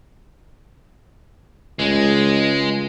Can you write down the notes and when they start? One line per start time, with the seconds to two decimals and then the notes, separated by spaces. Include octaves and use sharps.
1.79 C#2 G#3